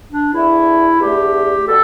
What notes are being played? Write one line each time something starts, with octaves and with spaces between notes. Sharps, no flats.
D4
E2 D3 A3 E4
E2 D3 A3 G4
B2 G3 A4